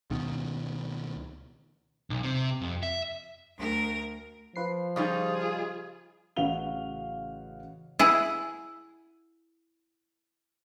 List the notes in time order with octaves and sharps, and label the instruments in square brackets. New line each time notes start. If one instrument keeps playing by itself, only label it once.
[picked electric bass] C#2 B2 D#3
[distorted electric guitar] B1
C3
F2
E5
[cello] D2 A#4
[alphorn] F3 [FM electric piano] F4 B4 C7
[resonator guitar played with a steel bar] C#3 G3 D#4 [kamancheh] F4 G#4 [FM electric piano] D#5
[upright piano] A1 C#3 F#4 F5 F7 G7
[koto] E4 G#4 F#5